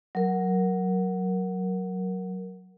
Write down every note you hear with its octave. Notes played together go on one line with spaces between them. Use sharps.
F#3 A#4